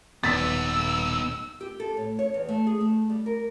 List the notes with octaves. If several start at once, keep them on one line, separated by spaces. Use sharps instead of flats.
D#1 B3 D#4 E6 A6 B6
G4
A4
A2
C#5
E2
A3
G#4
A3
G3
A#4